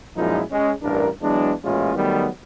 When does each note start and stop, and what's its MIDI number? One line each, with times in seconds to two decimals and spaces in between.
0.16 0.42 42
0.16 0.42 46
0.16 0.42 53
0.16 0.42 56
0.16 0.42 63
0.16 0.42 64
0.51 0.72 56
0.51 0.72 61
0.82 1.07 33
0.82 1.07 43
0.82 1.07 62
0.82 1.07 70
1.21 1.52 52
1.21 1.52 54
1.21 1.52 56
1.21 1.52 59
1.21 1.52 62
1.64 1.95 33
1.64 1.95 46
1.64 1.95 56
1.64 1.95 61
1.64 1.95 64
1.64 1.95 65
1.95 2.27 51
1.95 2.27 54
1.95 2.27 55
1.95 2.27 57
1.95 2.27 59